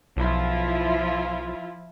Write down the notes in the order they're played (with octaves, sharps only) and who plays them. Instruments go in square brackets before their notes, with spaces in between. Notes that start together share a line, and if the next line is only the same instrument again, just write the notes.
[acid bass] B1 [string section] F3 E4 F4